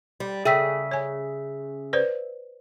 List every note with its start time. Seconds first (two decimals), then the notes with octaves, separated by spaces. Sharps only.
0.20 G3
0.45 C#3 G#4 E5 G5 E6 B6
0.91 C#5 G#5
1.93 B4 C5 D5